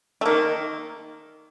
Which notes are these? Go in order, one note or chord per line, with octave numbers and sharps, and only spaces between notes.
A3
D#3 A#3